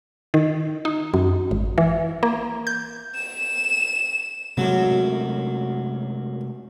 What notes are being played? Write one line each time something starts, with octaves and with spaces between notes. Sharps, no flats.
D#3
D#4
F#2
G#1
E3
A#3
G6
E7
F#2 C3 F#3 G#3 A3